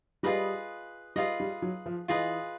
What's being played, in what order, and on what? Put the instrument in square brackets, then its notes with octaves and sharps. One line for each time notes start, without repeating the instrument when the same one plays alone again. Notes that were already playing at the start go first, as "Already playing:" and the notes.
[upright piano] G3 [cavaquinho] F4 G#4 B4 D#5
[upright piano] G3 [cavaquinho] F4 G#4 B4 D#5
[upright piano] G3
F#3
F3
[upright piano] E3 [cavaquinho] F4 G#4 B4 D#5